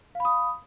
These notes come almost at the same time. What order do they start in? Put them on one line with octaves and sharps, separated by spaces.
F5 B5 D#6